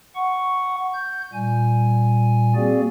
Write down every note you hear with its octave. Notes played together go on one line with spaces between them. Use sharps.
F#5 C#6
G6
A#2 G3 G#5
A#3 C4 F#4 G#4 D5